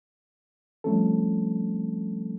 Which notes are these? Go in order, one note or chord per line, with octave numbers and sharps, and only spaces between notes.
F3 G3 A3 C4 C#4 A4